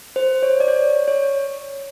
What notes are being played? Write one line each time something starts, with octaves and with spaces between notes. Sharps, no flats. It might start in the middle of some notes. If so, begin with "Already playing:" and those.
C5
C#5
D5
C#5
C#5